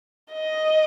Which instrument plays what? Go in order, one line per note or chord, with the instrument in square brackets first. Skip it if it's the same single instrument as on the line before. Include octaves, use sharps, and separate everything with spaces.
[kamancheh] D#5